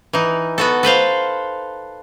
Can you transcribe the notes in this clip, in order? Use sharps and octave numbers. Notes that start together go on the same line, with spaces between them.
E3 D#4
B3 F#4 A4
A4 B4 C5 F5